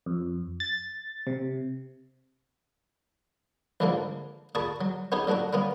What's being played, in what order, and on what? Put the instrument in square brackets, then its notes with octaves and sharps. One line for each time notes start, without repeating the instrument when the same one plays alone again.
[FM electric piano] F2
A6
C3
[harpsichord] A#1 G#2 D3 E3 F3 A#3
A#2 G#4 A5 B5 C#6 D#6
F#3
B3 C#4 D#4 G4 G#4 C#5
A#2 F#3 A3 D4 F#4
G3 A#3 B3 C#4